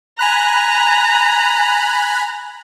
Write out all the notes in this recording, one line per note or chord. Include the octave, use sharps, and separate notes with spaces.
G#5 A#5 B5 F#6